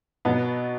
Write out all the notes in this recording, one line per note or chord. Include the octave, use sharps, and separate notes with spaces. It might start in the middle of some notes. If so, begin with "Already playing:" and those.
B2 F#3 B3